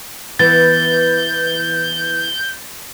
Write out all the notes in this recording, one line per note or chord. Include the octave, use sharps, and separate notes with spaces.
E3 B3 G6 A6